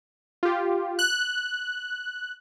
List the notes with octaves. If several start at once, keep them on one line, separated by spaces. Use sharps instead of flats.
F4 G4
F#6